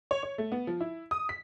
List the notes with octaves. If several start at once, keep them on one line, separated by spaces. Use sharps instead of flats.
C#5
C#5
A3
B3
F3
E4
D#6
B6